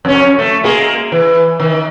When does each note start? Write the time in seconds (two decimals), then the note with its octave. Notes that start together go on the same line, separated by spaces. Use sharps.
0.05 F2 C#4
0.39 A3
0.63 G#3 A#3 G#4
1.12 E3
1.60 D#3